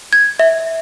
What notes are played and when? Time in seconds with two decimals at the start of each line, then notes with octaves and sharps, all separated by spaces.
0.13 G#6
0.40 E5